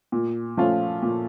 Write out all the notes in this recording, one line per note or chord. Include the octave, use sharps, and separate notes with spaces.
A#2
F3 A3 C#4 F4
A#2